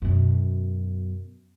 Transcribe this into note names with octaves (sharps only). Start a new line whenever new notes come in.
F#2 B2